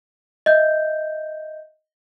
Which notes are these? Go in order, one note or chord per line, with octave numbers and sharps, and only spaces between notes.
D#5 E5 G6